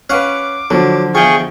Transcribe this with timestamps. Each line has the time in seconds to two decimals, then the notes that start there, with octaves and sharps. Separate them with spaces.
0.10 C#4 B4 F5 F#5 C#6 D6
0.70 D3 F3 F#3
1.15 E2 F4 G#4 G5 C#6